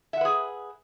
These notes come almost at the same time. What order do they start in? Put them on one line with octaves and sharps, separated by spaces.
E5 F#5 B4 G#4